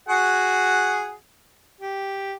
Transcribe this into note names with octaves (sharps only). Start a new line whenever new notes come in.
F#4 G#4 F#5
G4